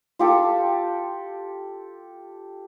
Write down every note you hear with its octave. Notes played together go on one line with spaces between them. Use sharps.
F4 G4 A4